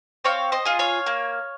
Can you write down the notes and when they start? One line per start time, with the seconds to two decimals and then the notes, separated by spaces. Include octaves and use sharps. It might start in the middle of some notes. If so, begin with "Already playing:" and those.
0.25 C4 C#5 F5
0.52 C5 D#5
0.65 F4 G#4
0.79 C#5 F5
1.06 A#3